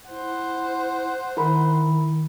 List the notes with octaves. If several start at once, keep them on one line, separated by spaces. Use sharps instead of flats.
E4 C5 F#5
D#3 E4 A#4 B5